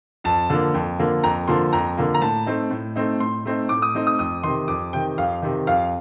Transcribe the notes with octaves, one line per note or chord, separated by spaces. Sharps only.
F2 A5
D3 F3 A#3
F2
D3 F3 A#3
F2 A#5
D3 F3 A#3 C6
F2 A#5
D3 F3 A#3
A#5
A2 A5
A3 C4 D#4
A2
A3 C4 D#4
A2 C6
A3 C4 D#4
A2 D6
D#6
A3 C4 D#4
D#6
F2 D#6
C3 D#3 C6
F2 D6
C3 D#3 G5
F2 F5
C3 D#3
F2 F5